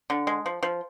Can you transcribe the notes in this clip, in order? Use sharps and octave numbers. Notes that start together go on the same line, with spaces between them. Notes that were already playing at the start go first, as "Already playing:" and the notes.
D3
G#3
F3
F3